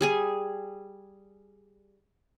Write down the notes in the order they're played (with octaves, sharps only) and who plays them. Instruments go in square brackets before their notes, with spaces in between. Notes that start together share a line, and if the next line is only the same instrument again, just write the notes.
[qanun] G3 G#4 G#5